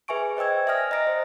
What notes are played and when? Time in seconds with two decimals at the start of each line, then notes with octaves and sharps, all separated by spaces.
0.08 G#4 B4 E5 G#5 C#6 D7
0.37 C5 D#5 G5 E6 G#6
0.66 D5 E5 G#5 D#6 F6 A#6
0.91 D#5 A#5 A#6 D7
1.07 C5